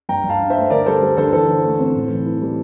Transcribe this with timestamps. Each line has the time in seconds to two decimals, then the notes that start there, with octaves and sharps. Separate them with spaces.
0.09 G2 G5 A#5
0.24 G2
0.29 F5 A5
0.39 D4
0.50 C5 E5
0.56 A3
0.70 D3 A#4 D5
0.86 G3 A4 C5
1.02 G3
1.17 D3 A4 C5
1.33 E3 A4 C5
1.48 E3
1.64 A3
1.79 C4
1.95 A2
2.10 E3
2.26 E3
2.42 G3